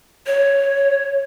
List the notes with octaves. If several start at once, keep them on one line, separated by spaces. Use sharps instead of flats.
C#5